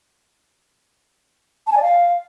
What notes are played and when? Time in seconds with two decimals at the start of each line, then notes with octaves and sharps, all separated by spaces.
1.67 A5
1.72 G#5
1.77 D5
1.82 F5